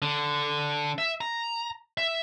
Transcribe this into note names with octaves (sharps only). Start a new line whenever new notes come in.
D3
E5
A#5
E5